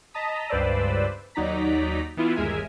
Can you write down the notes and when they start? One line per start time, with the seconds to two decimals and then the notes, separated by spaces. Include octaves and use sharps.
0.14 D#5 A5 A#5 D#6 B6
0.49 C#2 G2 B4 C5 D5 E6
1.35 D#2 F#3 D#4 D5 A#5 B6
2.17 E3 B3 E4 F4
2.36 G1 D#2 G#3 A#4 E5 G#5